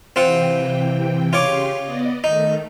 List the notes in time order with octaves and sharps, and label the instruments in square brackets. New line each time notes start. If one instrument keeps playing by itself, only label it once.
[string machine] C3 E3 G5 [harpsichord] C4 F4 F#5
[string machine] C#3 G4 C6 [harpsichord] F4 C#5 D6
[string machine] B3 D5 D#5
[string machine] D#3 A3 [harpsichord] D#4